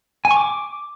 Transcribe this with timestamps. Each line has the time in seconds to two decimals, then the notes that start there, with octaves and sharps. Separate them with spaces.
0.25 G#5
0.31 C#6
0.37 D6